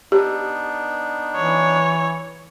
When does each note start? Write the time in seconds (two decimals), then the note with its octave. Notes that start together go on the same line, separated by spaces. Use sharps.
0.12 B3 D4 D#4 G4
1.36 E3 C#5